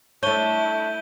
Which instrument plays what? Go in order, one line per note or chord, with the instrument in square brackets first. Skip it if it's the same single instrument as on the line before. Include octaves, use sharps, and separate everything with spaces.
[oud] A3 C#5 [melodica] D4 [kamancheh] E4 [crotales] G6 D#7 G7